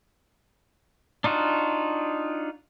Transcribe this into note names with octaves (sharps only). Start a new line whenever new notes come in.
D4 D#4 F4 F#4